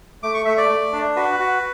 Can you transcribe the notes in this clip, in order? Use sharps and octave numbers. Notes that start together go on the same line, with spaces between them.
A3 D6
C#6
A3 E5
D5
A3
D4
F#4 B4
F#4